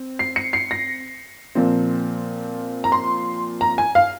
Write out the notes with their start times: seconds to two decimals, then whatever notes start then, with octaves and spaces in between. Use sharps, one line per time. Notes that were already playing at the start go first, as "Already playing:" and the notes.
Already playing: C4
0.19 C7
0.36 C#7
0.53 C7
0.71 A#6
1.55 A#2 F3 C4
2.84 A#5
2.92 C6
3.61 A#5
3.78 G#5
3.95 F5